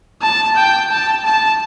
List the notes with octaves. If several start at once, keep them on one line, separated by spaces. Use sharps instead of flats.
A5
G5
A5
A5